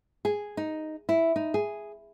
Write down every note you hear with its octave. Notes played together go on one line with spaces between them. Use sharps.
G#4
D#4
E4
D#4
G#4